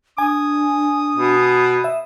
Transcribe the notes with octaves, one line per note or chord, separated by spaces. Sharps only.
D4 G#5 D#6
B2
E5